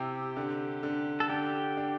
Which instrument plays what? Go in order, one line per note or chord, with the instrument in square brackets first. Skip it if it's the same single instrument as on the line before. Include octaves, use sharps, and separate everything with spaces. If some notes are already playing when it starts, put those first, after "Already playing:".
Already playing: [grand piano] C3 E4 [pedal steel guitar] G4
[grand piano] D3
D3
[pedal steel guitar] A4
[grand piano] D3 [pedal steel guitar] G4
[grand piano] D4